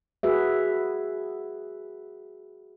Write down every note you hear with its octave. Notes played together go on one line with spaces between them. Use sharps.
F#4 G#4 B4 E5